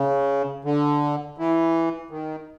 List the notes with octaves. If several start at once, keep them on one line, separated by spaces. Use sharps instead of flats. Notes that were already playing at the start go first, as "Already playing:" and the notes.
Already playing: C#3
D3
E3
D#3